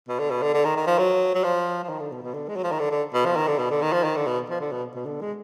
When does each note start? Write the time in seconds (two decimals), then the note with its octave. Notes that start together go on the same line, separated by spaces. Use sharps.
0.08 B2
0.19 D3
0.31 B2
0.42 D3
0.54 D3
0.65 D#3
0.76 D#3
0.87 F3
0.98 F#3
1.35 F#3
1.44 F3
1.83 F3
1.89 D#3
2.00 D3
2.12 B2
2.22 B2
2.34 D3
2.48 G#3
2.56 F#3
2.64 F3
2.72 D#3
2.80 D3
2.91 D3
3.14 B2
3.25 F3
3.36 D#3
3.47 D3
3.59 B2
3.71 D3
3.82 D#3
3.92 F3
4.04 D#3
4.16 D3
4.27 B2
4.50 F3
4.61 D3
4.72 B2
4.95 B2
5.05 D3
5.21 G#3